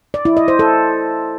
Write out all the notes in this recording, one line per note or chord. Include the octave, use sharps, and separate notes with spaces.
D5
E4
D#5
C5
A4